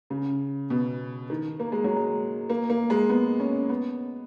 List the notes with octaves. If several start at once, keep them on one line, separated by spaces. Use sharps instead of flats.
C#3
B2
D#3
A#3
G#3
F#3
G#3
A#3
A#3
G#3
B3
C#4
B3